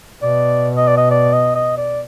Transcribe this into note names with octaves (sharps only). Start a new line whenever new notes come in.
B2 D5
D#5
D5
D#5
D5
D#5
D#5
D5